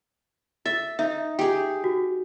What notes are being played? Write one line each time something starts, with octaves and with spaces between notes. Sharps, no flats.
E5 A6
D#4 E5
G4 G#4
F#4